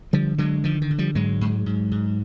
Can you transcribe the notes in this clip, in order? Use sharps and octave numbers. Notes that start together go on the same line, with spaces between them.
D3 F3 G3
D3 F#3 G#3
D3 D#3 F3
D#3
D3
F3 G3
G#2 F#3 G#3
G#2
G#2
G#2